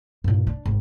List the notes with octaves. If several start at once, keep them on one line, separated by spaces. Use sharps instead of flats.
G2 A#2
D4
G#1